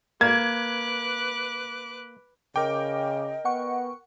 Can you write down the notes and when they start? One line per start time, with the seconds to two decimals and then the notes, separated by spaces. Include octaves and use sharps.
0.21 A#3 B4 D6 F#6 G#6
2.56 C#3 A#4 D#5 G5 D6
3.45 B3 F#5 C#6